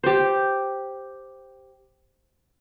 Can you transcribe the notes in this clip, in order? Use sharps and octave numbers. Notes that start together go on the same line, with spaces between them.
G4 C5